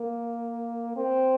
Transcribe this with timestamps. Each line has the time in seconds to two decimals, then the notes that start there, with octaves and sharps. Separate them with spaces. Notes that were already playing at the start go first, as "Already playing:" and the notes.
Already playing: A#3
0.97 C4